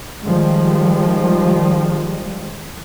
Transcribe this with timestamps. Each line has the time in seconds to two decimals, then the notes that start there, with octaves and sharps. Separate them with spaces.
0.23 D#3 F3 G3 G#3